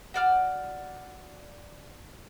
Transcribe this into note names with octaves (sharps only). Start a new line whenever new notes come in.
F#4 D5 F6